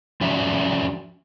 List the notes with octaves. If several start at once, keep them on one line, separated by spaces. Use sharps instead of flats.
F3 C#4 D4 F#4 E5